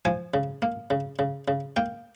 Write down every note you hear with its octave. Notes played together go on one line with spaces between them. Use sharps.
F3 G#5
C#3
A#3
C#3
C#3
C#3
A#3 G5